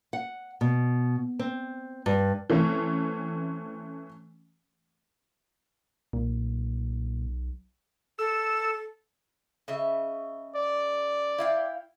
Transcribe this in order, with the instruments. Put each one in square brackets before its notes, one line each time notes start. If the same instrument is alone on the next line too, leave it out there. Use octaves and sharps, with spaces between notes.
[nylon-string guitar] F#5
B2
C4
G2
[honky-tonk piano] E3 A3 C4 C#4
[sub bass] B1 [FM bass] A#2
[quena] A4 [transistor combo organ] E6
[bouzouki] C#3 D#5 E5
[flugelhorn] D5
[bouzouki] E4 F5 G5